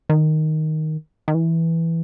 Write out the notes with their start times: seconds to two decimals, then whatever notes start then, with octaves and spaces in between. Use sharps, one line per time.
0.09 D#3
1.28 D#3
1.35 E3